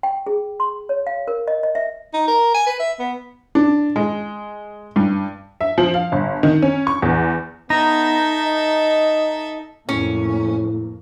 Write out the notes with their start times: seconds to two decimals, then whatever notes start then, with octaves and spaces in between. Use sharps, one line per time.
0.03 G5
0.27 G#4
0.60 C6
0.89 C#5
1.07 F5
1.28 A#4
1.48 D#5
1.63 D#5
1.75 E5
2.14 D#4
2.28 A#4
2.55 G#5
2.66 B4
2.80 E5
2.99 B3
3.55 D4
3.96 G#3
4.96 G2
5.61 E5
5.78 F3
5.94 F5
6.12 G1
6.43 D#3
6.62 C#4
6.87 C#6
7.02 E2
7.70 B3 D#4 A4 E5 A#5 A#6
8.42 D#5
9.89 F2 A2 C3 A#3 C#4